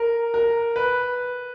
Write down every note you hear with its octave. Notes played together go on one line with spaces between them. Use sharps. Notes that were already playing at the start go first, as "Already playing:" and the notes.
Already playing: A#4
A#4
B4